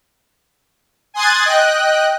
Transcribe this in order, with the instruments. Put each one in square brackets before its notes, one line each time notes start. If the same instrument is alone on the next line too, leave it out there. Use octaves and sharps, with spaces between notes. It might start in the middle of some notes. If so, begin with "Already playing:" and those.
[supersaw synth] G#5 C6 D#6 F#6 G#6 A6
D#5 G5 F#6